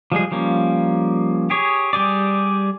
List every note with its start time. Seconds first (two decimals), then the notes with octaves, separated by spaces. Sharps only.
0.12 F3 G3 G#3 G#4
0.32 F3 G3 A#3 C#4
1.50 G4 G#4 C#5
1.93 G3 G4 G#4 D5